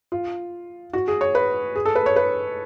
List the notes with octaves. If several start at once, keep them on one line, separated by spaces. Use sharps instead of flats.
F4
F#4
G#4
C#5
B4
G#4
A4
B4
C#5
B4